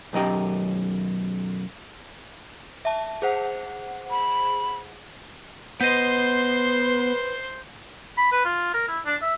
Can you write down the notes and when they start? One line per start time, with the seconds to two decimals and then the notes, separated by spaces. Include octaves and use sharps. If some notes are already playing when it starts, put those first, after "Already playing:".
0.13 B1 F#2 D#4 G4
2.85 E5 A5
3.22 G#4 C5 F#5
4.11 B5
5.81 B3 B4 C5 D#5 C6 G6
8.17 B5
8.32 B4
8.45 F4
8.74 A#4
8.88 E4
9.06 D4
9.22 E5